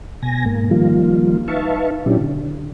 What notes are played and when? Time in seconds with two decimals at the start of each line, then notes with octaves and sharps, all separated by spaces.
0.23 B2 G#5 A#6
0.46 G#2 A#3
0.71 D#3 F3 G3 A#3 F4
1.48 D#4 B4 E5 F5 A5 C#6
2.06 A#2 F#3 C#4 D4 E4 G4
2.19 D3